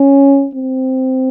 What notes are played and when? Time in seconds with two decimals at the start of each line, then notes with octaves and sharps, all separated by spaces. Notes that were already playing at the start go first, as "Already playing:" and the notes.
Already playing: C#4
0.55 C4